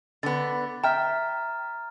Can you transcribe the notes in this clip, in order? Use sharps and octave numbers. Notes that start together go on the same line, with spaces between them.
D3 B3 A6
E5 G5 A#5 F6